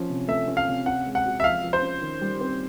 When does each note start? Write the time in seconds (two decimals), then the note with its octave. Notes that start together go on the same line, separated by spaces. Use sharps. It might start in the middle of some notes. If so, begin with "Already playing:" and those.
Already playing: F3 C#4
0.10 C3
0.28 A3 E5
0.48 C#4
0.57 F5
0.68 C3
0.86 C#4 F#5
1.06 G#3
1.15 F#5
1.25 F#4
1.40 E5
1.44 F3 F5
1.63 F3
1.73 C5
1.82 C#4
2.01 D#3
2.21 G3
2.41 C4